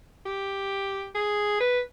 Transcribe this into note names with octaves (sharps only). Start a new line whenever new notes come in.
G4
G#4
B4